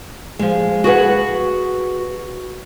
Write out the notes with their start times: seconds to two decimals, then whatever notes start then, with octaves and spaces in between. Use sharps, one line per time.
0.39 F3 G#3
0.84 F#4 G#4 B4 F#5